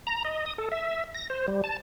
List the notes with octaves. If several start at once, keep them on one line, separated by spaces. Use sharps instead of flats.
A#5
D#5
D#6
A4
E5
A#6
C5
G3
A5